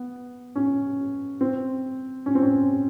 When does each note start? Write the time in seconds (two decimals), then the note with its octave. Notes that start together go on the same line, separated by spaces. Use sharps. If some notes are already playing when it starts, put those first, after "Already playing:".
Already playing: B3
0.55 C#4
1.41 C4
2.26 C#4
2.35 C4
2.42 C#4